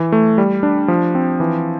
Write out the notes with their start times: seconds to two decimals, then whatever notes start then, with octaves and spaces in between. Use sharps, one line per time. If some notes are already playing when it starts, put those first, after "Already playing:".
Already playing: E3
0.12 A3
0.38 G3
0.63 D4
0.88 F3
1.15 C4
1.40 E3